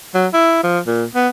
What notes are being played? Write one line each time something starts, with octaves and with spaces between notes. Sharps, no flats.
F#3
E4
F3
A#2
B3